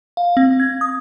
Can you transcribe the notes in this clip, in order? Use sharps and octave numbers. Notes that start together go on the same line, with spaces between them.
F5
C4
G#6
D#6